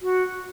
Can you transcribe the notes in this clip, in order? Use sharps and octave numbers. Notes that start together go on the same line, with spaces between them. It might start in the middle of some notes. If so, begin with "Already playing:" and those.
F#4